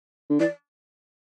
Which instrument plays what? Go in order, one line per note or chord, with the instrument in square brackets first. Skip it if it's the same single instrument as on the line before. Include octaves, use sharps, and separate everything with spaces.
[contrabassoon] D3
[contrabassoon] E3 [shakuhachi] D5